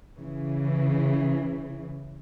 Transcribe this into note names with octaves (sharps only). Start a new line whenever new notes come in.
C#3 E3